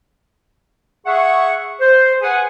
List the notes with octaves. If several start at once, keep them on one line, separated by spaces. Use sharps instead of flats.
G#4 E5 F#5 C#6
C5
G#4 B4 F#5 G#5